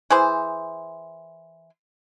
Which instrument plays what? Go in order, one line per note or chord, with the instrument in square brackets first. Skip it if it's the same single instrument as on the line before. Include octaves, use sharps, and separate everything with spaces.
[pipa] E3 G#4 C5